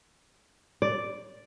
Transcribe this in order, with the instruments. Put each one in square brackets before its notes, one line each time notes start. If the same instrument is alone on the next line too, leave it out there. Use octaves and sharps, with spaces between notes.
[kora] D5